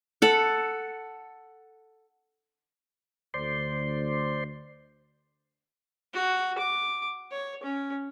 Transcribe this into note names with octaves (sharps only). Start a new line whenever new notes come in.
A4 F#5
D2 C5 D5 C6
F#4
D6
C#5
C#4